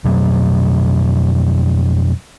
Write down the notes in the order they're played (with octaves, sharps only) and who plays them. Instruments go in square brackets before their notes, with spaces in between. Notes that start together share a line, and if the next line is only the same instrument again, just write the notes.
[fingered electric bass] F2 B2 F#3